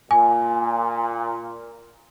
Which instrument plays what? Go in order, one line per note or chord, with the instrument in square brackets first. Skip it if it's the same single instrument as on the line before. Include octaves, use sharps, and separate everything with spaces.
[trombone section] A#2 [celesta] G#5